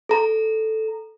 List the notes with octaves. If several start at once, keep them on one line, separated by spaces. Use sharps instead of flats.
A4 A#5